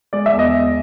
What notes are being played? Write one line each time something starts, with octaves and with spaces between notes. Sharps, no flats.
G#3 D5
E5
E2
D#5
E2